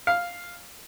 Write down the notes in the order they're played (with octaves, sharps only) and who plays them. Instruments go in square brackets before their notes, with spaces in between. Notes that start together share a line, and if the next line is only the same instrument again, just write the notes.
[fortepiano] F5